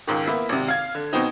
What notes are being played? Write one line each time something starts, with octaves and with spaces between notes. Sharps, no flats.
C#2 G#2 D#3
A#3 B3 E4 E5
G#1 C3
F5 G#6
D3
B2 B3 C4 D#4